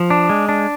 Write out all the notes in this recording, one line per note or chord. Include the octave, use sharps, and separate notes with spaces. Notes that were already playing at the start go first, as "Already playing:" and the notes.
Already playing: F3
D4
G#3
D4